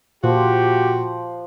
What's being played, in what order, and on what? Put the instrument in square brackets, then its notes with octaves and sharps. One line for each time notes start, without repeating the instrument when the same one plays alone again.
[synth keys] A#2 [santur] F3 [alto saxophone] F#4 [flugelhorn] G4